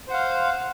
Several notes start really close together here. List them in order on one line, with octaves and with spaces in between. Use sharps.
C5 F#5 F5